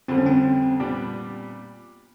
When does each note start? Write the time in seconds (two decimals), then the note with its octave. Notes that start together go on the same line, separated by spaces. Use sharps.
0.08 F2 D3 G3 C4
0.18 C#4
0.26 C4
0.79 A#2 G3 B3 D4 G4